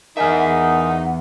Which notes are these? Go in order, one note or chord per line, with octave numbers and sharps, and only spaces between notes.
E2 D#4 A#4 E5 F#5 G#5 F6